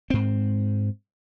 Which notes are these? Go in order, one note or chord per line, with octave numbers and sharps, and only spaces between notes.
G#2 C4